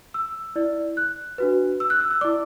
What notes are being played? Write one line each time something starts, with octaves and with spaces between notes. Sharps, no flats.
E6
E4 D5
F#6
D4 F#4 B4
E6
F#6
E6
E6
E4 D5 D6